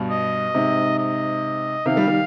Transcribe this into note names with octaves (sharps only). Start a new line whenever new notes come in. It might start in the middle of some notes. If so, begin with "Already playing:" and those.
Already playing: G2 B2
D#5
G#2 C3
D#5
C3 D#3 F5
D#3 G3
D#3 G3